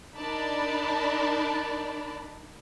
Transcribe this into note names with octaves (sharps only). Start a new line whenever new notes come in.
D4 D#4 A#4 D5 A5 B5